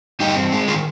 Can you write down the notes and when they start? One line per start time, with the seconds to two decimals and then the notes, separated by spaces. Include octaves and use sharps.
0.20 G2 D#4 G4
0.36 C4
0.52 G#3
0.68 D#3 F4 G#4